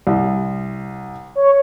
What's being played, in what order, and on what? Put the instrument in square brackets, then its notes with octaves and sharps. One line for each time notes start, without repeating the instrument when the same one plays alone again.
[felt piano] C2
[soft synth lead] C#5